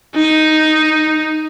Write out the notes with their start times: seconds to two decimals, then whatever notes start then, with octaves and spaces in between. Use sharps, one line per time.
0.15 D#4